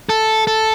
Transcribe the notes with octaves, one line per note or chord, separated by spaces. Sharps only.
A4
A4